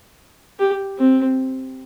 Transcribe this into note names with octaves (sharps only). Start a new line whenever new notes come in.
G4
C4